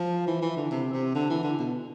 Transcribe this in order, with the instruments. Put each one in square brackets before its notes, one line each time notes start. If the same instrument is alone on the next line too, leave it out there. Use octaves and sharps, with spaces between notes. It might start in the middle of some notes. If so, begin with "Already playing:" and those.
Already playing: [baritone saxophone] F3
E3
E3
D3
C3
C3
D3
E3
D3
B2